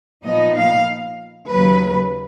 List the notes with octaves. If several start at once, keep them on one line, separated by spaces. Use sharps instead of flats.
A#2 F3 B3 D#4 D#5
F5
D#2 C#3 F#3 B4